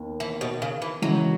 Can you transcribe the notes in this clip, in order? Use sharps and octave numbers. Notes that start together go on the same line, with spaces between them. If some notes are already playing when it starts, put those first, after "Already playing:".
Already playing: D#2 D#3 B3
E3
B2
C#3
E3
C#3 E3 F#3 G#3